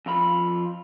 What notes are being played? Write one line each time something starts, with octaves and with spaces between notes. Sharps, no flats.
F2 F4 B5